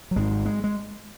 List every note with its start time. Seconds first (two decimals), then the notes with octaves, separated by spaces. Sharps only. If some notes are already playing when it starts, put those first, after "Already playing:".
0.11 F#3
0.16 G#1 G#2 G#3
0.46 G#3
0.64 G#3